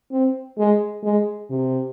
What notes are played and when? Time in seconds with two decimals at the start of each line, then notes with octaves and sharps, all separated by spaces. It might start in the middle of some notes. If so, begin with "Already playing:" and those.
0.12 C4
0.58 G#3
1.04 G#3
1.50 C3